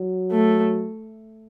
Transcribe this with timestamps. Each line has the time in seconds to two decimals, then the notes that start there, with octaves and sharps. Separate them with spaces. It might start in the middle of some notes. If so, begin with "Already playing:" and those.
Already playing: F#3
0.32 A3